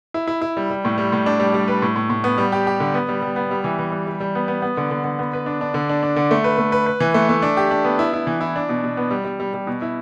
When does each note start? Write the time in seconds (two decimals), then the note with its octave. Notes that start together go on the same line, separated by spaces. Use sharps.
0.14 E4
0.27 E4
0.42 E4
0.57 G3
0.70 G3
0.85 A2
0.98 G3
1.12 A2
1.26 D4
1.40 G3
1.54 G3
1.68 B4
1.82 A2
1.96 A2
2.10 A2
2.24 B3
2.38 G3
2.52 G4
2.67 G4
2.80 D3
2.94 B3
3.09 G3
3.22 G3
3.36 B3
3.51 G3
3.64 E3
3.79 E3
3.92 G3
4.07 G3
4.20 G3
4.35 B3
4.48 B3
4.62 B3
4.77 D3
4.91 D3
5.04 D3
5.19 B3
5.33 B4
5.46 D4
5.61 D4
5.74 D3
5.89 D4
6.03 D4
6.16 D3
6.31 A3
6.44 B4
6.58 A3
6.72 B4
6.86 B4
7.00 E3
7.14 A3
7.29 A3
7.42 D4
7.57 G4
7.71 D4
7.84 B3
7.99 E4
8.13 E4
8.27 E3
8.41 E4
8.56 D4
8.69 B2
8.84 B2
8.97 B3
9.11 G3
9.25 G3
9.40 G3
9.54 G3
9.67 B2
9.82 E4